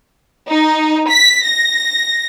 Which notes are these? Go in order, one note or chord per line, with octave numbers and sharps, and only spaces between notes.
D#4
B6
A#6